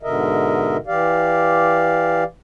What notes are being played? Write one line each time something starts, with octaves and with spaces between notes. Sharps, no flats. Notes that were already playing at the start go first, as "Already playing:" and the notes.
G#2 B2 D3 A#4 D#5 E5
E3 G4 D5 F5